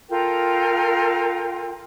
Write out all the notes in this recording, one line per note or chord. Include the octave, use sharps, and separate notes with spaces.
F4 A4 A#4 G5